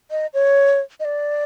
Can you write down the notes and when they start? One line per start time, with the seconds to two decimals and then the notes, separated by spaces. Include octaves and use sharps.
0.11 D#5
0.34 C#5
1.00 D#5
1.05 D5